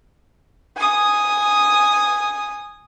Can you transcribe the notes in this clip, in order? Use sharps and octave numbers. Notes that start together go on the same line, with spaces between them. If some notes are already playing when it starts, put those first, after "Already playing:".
G#5 D#6